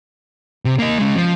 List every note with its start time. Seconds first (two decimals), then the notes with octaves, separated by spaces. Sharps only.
0.65 C3
0.79 A#3 D#5
0.98 G#3 C#4
1.16 F3